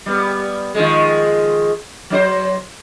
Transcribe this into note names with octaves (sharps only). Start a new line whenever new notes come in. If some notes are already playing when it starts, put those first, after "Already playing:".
G3 B3
D#3 F3 G#3
F#3 D#4 C5